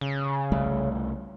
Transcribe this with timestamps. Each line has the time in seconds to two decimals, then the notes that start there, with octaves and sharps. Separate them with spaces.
0.01 C#3
0.52 C2 G3 A3